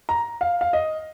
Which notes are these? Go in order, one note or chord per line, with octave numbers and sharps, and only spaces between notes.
A#5
F5
F5
D#5